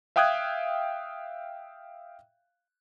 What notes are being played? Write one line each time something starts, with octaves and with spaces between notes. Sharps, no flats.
E5 F5 G5 D#6 F#6 G#6